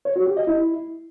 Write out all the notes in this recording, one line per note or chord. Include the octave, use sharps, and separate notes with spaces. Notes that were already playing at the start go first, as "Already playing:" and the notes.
C#5
F#4
G4
D#5
E4